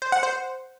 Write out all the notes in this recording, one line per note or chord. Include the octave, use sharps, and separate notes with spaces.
C5
F#5
C5